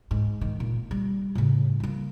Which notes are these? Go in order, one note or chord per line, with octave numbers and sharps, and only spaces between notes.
G#2
D#3
A#2
G3
A2 C#3
G3 A#3